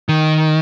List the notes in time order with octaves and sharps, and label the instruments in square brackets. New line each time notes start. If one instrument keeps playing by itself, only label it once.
[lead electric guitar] D#3